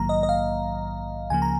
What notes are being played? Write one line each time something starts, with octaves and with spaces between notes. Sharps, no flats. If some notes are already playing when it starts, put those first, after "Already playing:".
Already playing: A#1 G#2 D#3 F#3 A#3 A#5
D#5
D#5
F5
C#2 C#3 F3 A#3 G#5
A#5